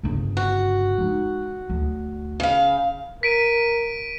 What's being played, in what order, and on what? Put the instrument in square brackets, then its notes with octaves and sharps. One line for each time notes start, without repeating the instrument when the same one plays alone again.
[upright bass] G1 C#3
[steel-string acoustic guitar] F#4
[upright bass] G#3 D#4
D2
[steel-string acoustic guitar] C#3 F5
[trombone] A#4 [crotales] B6 D7 D#7